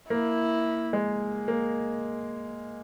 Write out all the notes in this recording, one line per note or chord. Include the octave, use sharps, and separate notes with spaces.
A#3 E4
G#3
A#3